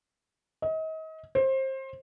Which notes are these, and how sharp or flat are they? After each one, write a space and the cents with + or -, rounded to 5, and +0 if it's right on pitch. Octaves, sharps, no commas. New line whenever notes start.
D#5 +35
C5 +25